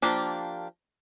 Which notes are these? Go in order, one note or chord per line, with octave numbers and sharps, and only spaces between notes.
F3 A#3 D4 G4